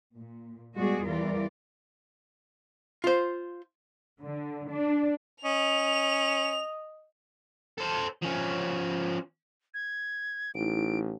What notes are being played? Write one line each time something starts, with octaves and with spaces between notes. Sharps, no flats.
A#2
G3 G#3 B3 F#4 G#4 D5
E2 E3 G3 F4 A#4 D5
F4 C5
D3
D4
C#4 D#5 F7
A4 C5
F3 C#4
G#6
A1 D#4 E4 D7